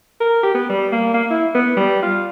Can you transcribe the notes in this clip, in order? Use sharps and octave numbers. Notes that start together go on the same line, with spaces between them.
A#4
G4
B3
G3
A#3
A#3
E4
B3
G3
F4